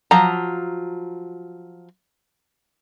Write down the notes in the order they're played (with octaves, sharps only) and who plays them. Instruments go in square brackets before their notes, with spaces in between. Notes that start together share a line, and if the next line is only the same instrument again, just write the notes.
[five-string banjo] F3 F#3 A#5